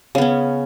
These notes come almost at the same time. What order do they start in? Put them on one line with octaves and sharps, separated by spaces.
C#3 B3 C#4